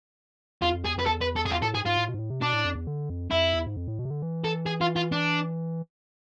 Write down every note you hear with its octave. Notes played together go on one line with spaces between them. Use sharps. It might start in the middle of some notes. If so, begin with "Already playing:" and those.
E2 F4
F2
E2 G#4
F2 B4
E2 A4
B4
A4
F2 G#4
E2 F4
A2 A4
G#2 G#4
G#2 F4
A2
B2
G#2
A2
C3
B2 D4
A2
F2
E2
D3
F2
F2 E4
E2
G#2
F2
A2
B2
C3
D3
E3
A4
G#4
F4
F4
D4